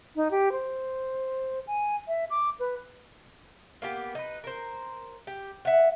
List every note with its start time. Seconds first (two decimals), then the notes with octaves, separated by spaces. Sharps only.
0.16 D#4
0.31 G4
0.52 C5
1.67 G#5
2.08 E5
2.30 D6
2.60 B4
3.82 A#3 B3 G4
4.15 D#4 B4
4.44 A#4 C5
5.27 G4
5.65 E5 F#5